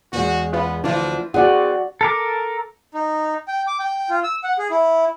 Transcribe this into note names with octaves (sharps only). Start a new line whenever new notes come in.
E2 G#3 F#4
B3 F4 B4
D2 E3 F3 D4 F4
C4 F#4 G#4 D5 F#5
A4 A#4 D6
D#4
G5
D6
G5
F4
E6
F#5
G#4
E4